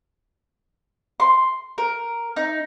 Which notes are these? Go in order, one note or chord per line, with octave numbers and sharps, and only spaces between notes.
C6
A#4
D#4